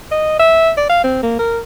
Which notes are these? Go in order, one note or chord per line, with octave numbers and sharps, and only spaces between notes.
D#5
E5
D5
F5
C4
A#3
A#4